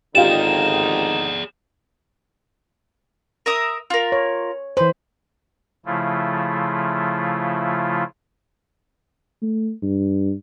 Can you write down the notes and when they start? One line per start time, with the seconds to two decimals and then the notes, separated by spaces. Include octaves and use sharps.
0.15 G#1 D3 D#4 F4 G4 G#4 D5 E7
3.46 A#4 E5 D#6
3.90 F4 A#4
4.12 C#5
4.77 E3 B4 C5
5.86 C#3 F3 A3 E4 F4
9.42 A3
9.82 G2